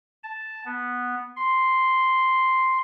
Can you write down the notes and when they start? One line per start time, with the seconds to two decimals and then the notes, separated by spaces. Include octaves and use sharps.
0.23 A5
0.66 B3
1.36 C6